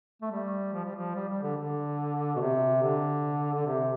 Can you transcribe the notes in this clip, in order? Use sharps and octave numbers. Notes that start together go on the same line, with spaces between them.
A3
G3
F3
G3
F3
G3
G3
D3
D3
B2
C3
D3
D3
C3